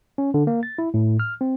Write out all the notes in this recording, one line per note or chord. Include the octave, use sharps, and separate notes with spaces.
C#4
D3
A#3
A6
E4
A2
F6
C4